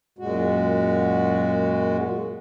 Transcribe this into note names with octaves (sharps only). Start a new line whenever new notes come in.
F#2 A#2 G#3 F#4